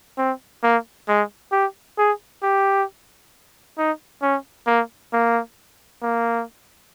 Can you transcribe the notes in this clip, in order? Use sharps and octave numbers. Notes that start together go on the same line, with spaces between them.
C4
A#3
G#3
G4
G#4
G4
D#4
C#4
A#3
A#3
A#3